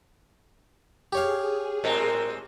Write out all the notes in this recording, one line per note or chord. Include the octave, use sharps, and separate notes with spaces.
G4 G#4 C#5 F5
A2 G#3 C4 A#4